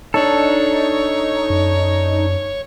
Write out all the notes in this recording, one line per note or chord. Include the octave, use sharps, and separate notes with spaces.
D4 D#4 A4 C#5
F#2